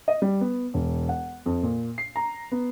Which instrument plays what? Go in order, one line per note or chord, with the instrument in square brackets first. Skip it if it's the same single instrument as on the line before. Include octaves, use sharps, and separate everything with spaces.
[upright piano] D#5
G3
B3
E1
F#5
F2
A#2
C7
A#5
B3